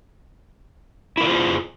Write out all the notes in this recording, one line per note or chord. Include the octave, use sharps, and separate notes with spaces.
E4 F4 G#4 A#4 C5